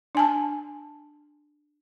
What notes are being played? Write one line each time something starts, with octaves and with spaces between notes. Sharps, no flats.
D4 G#5 A5